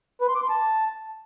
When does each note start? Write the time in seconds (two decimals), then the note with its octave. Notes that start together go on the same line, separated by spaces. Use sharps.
0.21 B4
0.28 C6
0.35 D6
0.42 C6
0.49 A5